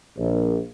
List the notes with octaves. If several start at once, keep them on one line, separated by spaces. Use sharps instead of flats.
A#1